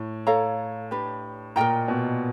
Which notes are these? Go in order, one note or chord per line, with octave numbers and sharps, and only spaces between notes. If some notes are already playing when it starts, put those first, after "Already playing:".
Already playing: A2
A4 C#5 F5 A#5
D4 G4 B4
A#2 A#4 D#5 G5 A#5
B2